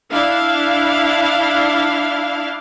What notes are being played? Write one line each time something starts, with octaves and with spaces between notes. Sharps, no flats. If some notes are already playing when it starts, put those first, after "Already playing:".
D4 E4 F5